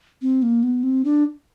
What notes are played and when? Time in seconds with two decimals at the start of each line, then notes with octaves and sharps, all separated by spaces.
0.22 C4
0.43 A#3
0.63 B3
0.83 C4
1.05 D4